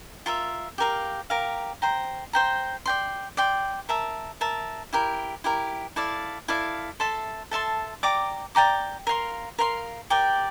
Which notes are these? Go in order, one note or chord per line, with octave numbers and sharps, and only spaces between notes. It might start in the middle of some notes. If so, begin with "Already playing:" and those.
F4 A#4 E5
G4 A#4 F5
G4 A#4 F5
C5 G5 A#5
C5 G5 A#5
D5 G5 C6
D5 G5 C6
A#4 E5 A5
A#4 E5 A5
E4 G4 A#4
E4 G4 A#4
E4 A4 D5 F5
E4 A4 D5 F5
A4 E5 A5 C6
A4 E5 A5 C6
D5 G5 A#5 D6
D5 G5 A#5 D6
A#4 F5 C6
A#4 F5 C6
G4 A#4 D5 G5